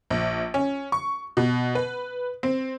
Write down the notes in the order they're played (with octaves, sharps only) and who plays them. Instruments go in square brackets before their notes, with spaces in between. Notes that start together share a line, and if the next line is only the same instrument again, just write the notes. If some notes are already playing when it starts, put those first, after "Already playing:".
[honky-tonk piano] A#1
C#4
C#6
B2
B4
C4